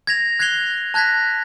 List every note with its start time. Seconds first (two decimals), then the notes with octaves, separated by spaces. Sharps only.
0.07 G#6 A#6 F7
0.39 F#6 G#6 A#6 C7 F7 G7
0.94 A5 F#6 G#6 A#6 B6